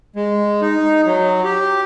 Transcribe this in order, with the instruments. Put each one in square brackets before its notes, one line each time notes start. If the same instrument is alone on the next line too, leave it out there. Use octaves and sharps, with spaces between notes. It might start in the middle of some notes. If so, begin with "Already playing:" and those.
[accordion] G#3
D#4
F#3
G4